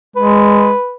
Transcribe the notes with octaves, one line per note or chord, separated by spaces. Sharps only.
G#3 B4